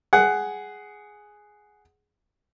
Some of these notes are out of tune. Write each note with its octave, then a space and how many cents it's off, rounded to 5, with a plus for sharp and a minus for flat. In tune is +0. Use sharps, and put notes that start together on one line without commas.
G#4 +5 F#5 +10